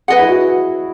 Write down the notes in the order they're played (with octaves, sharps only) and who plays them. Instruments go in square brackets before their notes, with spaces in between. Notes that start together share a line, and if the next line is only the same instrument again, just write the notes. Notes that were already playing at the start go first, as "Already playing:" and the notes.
[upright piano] G#4 [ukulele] B4 D#5 F#5
[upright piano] E4
F#4